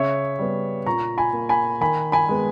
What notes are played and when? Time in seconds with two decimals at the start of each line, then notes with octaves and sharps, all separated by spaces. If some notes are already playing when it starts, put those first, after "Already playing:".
Already playing: C#3 C#5 E5
0.39 G3 B3
0.86 A#2 A#5 C#6
1.18 G#5 B5
1.33 A#3
1.49 G#5 B5
1.81 D#3 G#5 B5
2.12 G#5 B5
2.29 G#3 B3